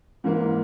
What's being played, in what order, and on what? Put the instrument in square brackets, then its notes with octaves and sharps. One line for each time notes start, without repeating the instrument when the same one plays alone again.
[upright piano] G#2 E3 A#3